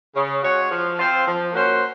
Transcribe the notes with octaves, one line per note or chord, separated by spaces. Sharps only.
C#3
G#3 C#4 F#4 C#5
F3
C4 F4 C5
F3
A#3 C#4 F#4 C5